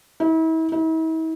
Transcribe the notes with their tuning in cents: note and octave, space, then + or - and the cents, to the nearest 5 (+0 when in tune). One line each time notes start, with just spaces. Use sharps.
E4 -40
E4 -45